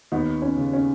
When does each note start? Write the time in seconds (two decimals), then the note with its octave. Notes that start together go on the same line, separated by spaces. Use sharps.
0.12 D#2 B3 D#4
0.42 C#4
0.57 C#3
0.73 C#4